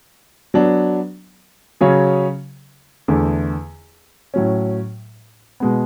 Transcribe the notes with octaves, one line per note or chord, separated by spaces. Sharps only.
F#3 B3 D4
C#3 F#3 C#4 G#4 C#5
E2 D3 A3
A2 F#3 C#4
B2 G#3 B3